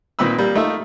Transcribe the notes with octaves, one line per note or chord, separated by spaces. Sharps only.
A#2 D#3 C4 B4 B5 E6
G3 A#3
A3 D#4 F4 E5